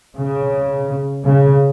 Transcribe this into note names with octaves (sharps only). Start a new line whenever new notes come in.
C#3
C#3